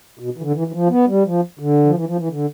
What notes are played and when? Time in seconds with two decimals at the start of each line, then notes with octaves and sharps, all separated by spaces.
0.19 B2
0.38 E3
0.42 D3
0.54 E3
0.68 E3
0.72 F3
0.89 B3
1.07 G3
1.25 F3
1.59 D3
1.85 F3
1.95 E3
2.07 F3
2.18 E3
2.30 D3